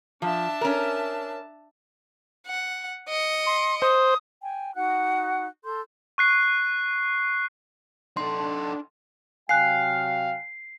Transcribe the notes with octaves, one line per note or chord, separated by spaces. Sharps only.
F3 D4 E5 A5
C#4 A#4
F#5
D#5 C#7
C6
C5 D#6
G5 G#5
D#4 F#4 F#5 F#6
A4 C6 G6
C#6 F#6 C7
D4 D#4 A4 C6
C3 F#3 F5 G5 G#5 F#6 C7